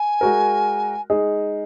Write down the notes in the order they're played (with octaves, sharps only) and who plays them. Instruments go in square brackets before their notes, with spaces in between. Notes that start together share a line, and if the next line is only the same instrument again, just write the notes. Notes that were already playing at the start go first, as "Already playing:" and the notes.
Already playing: [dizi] G#5
[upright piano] G#3 F#4 A#4
G#3 D#4 G#4